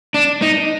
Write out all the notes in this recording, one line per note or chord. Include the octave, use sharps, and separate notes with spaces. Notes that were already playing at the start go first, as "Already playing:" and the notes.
D4
D#4